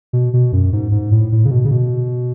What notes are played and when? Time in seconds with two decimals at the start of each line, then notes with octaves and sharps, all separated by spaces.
0.13 B2
0.33 B2
0.52 F#2
0.73 G#2
0.92 G#2
1.12 A2
1.32 A2
1.45 C#3
1.51 B2
1.65 C#3
1.71 B2